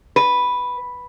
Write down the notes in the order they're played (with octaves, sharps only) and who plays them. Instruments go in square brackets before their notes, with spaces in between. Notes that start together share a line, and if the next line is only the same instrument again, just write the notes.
[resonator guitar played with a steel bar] B4